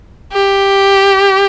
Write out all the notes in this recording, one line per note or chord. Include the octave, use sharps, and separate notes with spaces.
G4